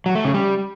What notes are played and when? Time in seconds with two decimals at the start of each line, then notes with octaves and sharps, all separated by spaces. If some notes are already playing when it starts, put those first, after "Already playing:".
0.06 F#3
0.15 A3
0.25 C#3
0.34 G3